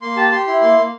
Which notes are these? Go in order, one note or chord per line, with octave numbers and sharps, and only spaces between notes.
A#3 C6
G4 A5
G4 C6
E4 C6
A#3 C6
A#3